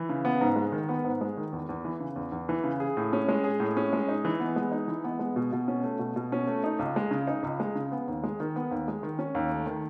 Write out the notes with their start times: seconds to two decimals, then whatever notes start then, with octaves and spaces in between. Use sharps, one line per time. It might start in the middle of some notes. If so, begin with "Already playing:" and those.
Already playing: E3
0.09 C#3
0.25 B3
0.41 G#2
0.56 G#3
0.72 D#3
0.89 B3
1.04 G#2
1.21 G#3
1.37 D#3
1.52 E2
1.69 E2
1.85 E3
2.00 C#3
2.16 E2
2.32 E2
2.49 E3
2.64 C#3
2.80 G#4
2.97 A2
3.13 C#4
3.29 G#3
3.44 G#4
3.60 A2
3.77 C#4
3.93 G#3
4.08 D#4
4.25 E3
4.40 B3
4.56 G#3
4.72 D#4
4.88 E3
5.04 B3
5.19 G#3
5.36 B2
5.52 B2
5.68 C#4
5.83 A3
5.99 B2
6.16 B2
6.32 C#4
6.47 A3
6.64 D#4
6.79 C#2
6.96 G#3
7.11 C#3
7.27 D#4
7.43 C#2
7.60 G#3
7.76 C#3
7.92 B3
8.08 D#2
8.24 G#3
8.40 D#3
8.56 B3
8.71 D#2
8.88 G#3
9.03 D#3
9.19 C#4
9.35 D#2
9.52 A3
9.67 D#3